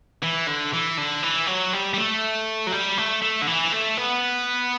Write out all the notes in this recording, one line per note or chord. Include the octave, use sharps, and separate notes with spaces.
E3
D3
E3
D3
E3
F#3
G3
G3
A3
F#3
G3
A3
A3
D3
E3
A3
B3